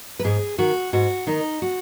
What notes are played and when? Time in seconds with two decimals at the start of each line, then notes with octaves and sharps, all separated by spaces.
0.20 B4
0.24 G#2 G#4
0.58 D#3 F#4
0.93 G#2 F#4
1.27 D#3 D#4
1.62 F#4